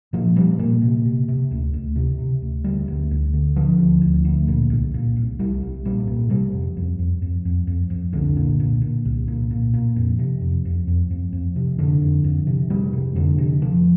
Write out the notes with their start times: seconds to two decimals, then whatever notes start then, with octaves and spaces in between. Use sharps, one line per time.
0.13 A#2 F3
0.36 A#2 G3
0.59 A#2 A#3
0.82 C3
1.05 C3
1.28 C3
1.51 D2
1.74 D2
1.96 C3
2.19 C3
2.42 D2
2.64 D2 G3
2.88 D2
3.11 D2
3.34 D3
3.56 D3 F3
3.79 D2
4.02 D2
4.25 D2
4.48 A#2
4.70 C2
4.94 A#2
5.16 C2
5.39 C2 G3
5.63 C2
5.85 A#2 G3
6.07 A#2
6.30 C3 G3
6.53 F2
6.77 F2
6.99 F2
7.22 F2
7.45 F2
7.67 F2
7.90 F2
8.13 C2 D3
8.37 A#2
8.60 A#2
8.81 A#2
9.05 C2
9.28 A#2
9.51 A#2
9.74 A#2
9.96 F2
10.19 C3
10.42 F2
10.65 F2
10.88 F2
11.11 F2
11.33 F2
11.56 C3
11.78 F2 D3
12.02 F2
12.24 F2
12.47 C3
12.70 F2 G3
12.93 C3
13.15 F2 D3
13.38 C3
13.62 C3 F3